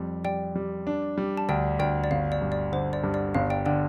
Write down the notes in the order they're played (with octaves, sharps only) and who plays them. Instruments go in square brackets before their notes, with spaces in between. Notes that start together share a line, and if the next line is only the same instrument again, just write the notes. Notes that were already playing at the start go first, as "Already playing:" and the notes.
Already playing: [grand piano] F2 G3
[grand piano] G3 [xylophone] D5 G5
[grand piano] G3
D4
G3
[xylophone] A5
[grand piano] D2 [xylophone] D5 G5
[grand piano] D2 [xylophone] D5 G5
[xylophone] D5
[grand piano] G1 [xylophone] F5
[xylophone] D5
[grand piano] G2
[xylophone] D5
[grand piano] D3 [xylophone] C5
[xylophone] D5
[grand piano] G2
[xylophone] D5
[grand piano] G1 [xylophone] F5
[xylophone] D5 G5
[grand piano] D3 [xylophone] D5 G5